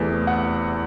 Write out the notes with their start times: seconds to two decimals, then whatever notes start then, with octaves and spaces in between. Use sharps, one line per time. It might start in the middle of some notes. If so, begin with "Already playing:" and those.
Already playing: E2 C3 E3 A3
0.27 F#5